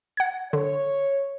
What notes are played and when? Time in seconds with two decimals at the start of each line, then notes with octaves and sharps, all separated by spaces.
0.17 F#5 G#6
0.53 D3 C#5